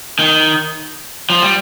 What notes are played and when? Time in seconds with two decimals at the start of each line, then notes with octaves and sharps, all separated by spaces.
0.19 D#3
1.30 F3
1.42 G3